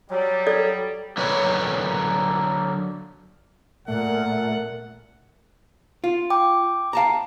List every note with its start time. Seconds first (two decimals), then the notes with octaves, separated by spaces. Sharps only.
0.10 F#3 G3
0.47 A4 D5
1.17 D3 F#3 A#3 B4 C#5
3.88 A#2 A3 A#4 F#5
6.04 F4
6.30 G5 D6
6.93 F5 A5 A#5